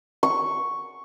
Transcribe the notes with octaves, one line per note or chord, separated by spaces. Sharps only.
C#6